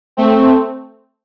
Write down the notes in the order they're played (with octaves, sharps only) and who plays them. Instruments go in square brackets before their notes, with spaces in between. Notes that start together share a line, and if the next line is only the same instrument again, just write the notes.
[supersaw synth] A3 C4